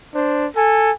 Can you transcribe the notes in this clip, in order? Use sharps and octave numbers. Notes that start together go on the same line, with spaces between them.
D4 C5
A4 G#5